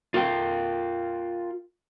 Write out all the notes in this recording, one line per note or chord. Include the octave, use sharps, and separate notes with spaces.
F4 A#4 F5 G5